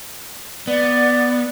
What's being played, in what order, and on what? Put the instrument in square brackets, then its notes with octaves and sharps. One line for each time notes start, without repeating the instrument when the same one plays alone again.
[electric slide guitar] B3 [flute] D5